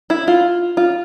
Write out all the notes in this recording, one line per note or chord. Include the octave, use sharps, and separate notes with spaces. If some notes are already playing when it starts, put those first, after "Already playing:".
E4
F4
F4